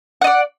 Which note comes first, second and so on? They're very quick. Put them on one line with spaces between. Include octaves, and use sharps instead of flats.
F#5 D#5 D5